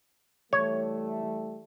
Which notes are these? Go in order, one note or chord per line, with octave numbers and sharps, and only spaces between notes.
E3 G3 A3 C#5